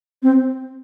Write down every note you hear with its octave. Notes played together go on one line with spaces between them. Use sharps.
C4